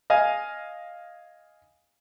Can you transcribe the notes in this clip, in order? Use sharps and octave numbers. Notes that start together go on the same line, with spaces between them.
D#5 F5 G#5